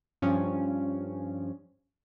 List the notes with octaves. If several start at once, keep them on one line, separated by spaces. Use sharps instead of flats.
G2 F3 C#4